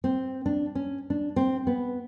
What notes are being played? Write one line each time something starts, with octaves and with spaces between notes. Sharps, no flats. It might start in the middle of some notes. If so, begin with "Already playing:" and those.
C4
D4
C#4
D4
C4
B3